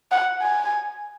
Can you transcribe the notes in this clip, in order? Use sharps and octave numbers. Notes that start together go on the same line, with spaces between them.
F#5
G#5